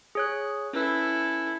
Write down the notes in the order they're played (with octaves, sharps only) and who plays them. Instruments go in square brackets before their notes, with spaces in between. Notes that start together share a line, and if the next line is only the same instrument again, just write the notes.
[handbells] G#4 C#5 F#6
[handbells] C#4 B4 [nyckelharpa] E4 A4